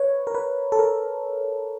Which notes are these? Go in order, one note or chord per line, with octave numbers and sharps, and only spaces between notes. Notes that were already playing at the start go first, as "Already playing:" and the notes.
Already playing: B4 C#5
A#4
B4
A4
A#4